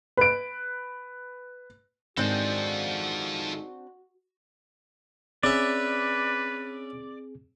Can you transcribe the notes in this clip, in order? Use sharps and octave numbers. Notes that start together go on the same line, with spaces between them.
B4 D7
G#2 D#3 C4 D4 F4 F#4 A4 G5
C4 C#4 G#4 B4 D5 E5